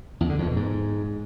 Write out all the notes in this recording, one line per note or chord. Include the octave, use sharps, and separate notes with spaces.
E2
D3
F2
B2
G#2